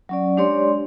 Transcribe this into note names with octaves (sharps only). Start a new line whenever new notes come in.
F#3 C#4 D5
G#3 D4 G4 C#5 D5 C6